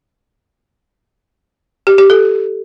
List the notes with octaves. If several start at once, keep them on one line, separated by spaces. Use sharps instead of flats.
G4
G4
A4